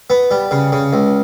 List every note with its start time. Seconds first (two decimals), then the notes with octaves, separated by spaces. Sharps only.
0.10 B3
0.31 G3
0.51 C#3
0.72 C#3
0.93 C#2